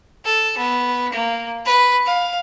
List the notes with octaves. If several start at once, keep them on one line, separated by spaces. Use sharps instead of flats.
A4
B3
A#3
B4
F5